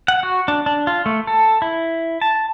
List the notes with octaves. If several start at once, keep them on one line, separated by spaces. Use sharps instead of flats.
F#5
F#4
D4
D4
F4
A3
A4
E4
A5